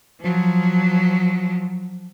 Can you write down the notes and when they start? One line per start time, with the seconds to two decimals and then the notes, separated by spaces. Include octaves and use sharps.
0.21 F3 F#3